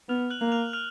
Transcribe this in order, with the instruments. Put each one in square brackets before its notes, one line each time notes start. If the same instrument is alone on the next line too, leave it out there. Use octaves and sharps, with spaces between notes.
[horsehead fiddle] B3 [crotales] F6 F7
[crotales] F#6 F#7
[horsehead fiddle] A#3
[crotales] F6 F7
F6 F7